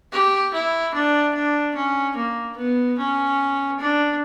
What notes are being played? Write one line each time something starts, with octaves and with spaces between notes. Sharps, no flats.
G4
E4
D4
D4
C#4
A#3
B3
C#4
D4